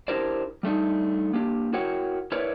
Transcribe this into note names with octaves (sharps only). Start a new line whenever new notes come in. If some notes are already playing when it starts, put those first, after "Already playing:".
D4 E4 G4 A#4 C5 D5
G3 A3 D4 D#4
A#3 D4 G4
E4 F#4 A#4 C#5 F#5 G5
E4 A#4 B4 C#5 D5 E5